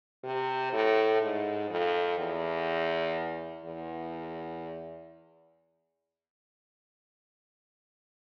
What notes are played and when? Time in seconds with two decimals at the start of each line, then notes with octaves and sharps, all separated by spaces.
0.24 C3
0.73 A2
1.21 G#2
1.70 F2
2.18 E2
3.65 E2